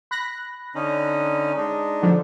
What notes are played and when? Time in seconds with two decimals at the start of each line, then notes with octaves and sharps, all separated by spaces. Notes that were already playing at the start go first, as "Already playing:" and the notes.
0.11 B5 F#6 A#6
0.75 D3 C#4 D#4
1.57 G#3 D4 D#4
2.02 D3 F3